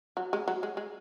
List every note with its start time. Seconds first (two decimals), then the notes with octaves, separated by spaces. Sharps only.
0.17 F#3
0.33 G#3
0.48 F#3
0.63 G#3
0.77 G#3